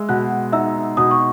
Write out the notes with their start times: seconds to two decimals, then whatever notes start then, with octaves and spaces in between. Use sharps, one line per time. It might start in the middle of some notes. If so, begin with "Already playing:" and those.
Already playing: G#3 E5 E6
0.09 B2 F#5 F#6
0.52 D#4 E5 E6
0.97 B2 D#6
1.11 C#6